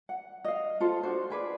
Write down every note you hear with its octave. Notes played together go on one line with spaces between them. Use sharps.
F#5
D#5 F5
F4 A4 C5
D4 F#4 C5
G#4 B4 D5